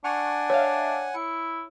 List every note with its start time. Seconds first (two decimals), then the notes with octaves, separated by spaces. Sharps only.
0.04 D4 F#5 G#5 C#6 F6
0.50 C#5 E5 F5
1.15 E4 C#7